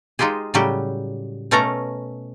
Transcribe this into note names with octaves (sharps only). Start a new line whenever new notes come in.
G#3 D#4 F4 G4 G#4
A2 C#3 F#3 G3 G4
B2 A3 C#4 A4 A#4 A#5